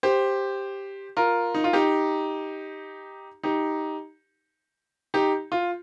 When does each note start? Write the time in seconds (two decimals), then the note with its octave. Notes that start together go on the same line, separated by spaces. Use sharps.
0.03 G4 C5
1.17 F4 A#4
1.55 D#4
1.64 F4
1.73 D#4 G4
3.43 D#4 G4
5.14 D#4 G4
5.52 F4